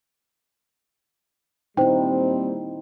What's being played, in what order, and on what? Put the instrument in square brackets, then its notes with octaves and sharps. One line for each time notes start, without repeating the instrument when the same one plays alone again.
[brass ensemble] A#2 G3 C4 [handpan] D#4 E4 [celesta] C5 G5